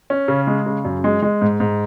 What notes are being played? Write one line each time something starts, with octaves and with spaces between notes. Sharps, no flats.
C#4
C#3
G#3
C#3
F#2
G#3
G#3
G#2
G#2